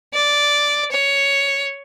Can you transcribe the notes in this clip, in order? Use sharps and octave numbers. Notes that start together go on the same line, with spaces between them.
D5
C#5